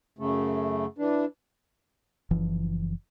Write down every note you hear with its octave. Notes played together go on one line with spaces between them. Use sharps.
F#2 C#3 A3
E3 D4
F#1 E3 F3